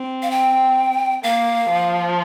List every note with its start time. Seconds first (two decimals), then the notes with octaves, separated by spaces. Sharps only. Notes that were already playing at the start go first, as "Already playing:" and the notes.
Already playing: C4
0.22 F5
0.31 G5
1.24 A#3 F5
1.69 F3